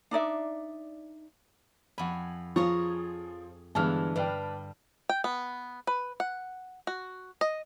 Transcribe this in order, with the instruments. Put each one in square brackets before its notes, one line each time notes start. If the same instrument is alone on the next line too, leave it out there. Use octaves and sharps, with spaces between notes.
[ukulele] D4 D#4 D5 E5
[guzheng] F2 G#5 [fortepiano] F#5 B5
[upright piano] F3 [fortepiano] F4 C#6 [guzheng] G#4 C#5 A#5
[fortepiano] G2 G#3 B3 [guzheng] D3 E3 [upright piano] A5 F6
[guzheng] G2 F5 [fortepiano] B4 D5 G5
[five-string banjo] G5
B3
B4
F#5
F#4
D#5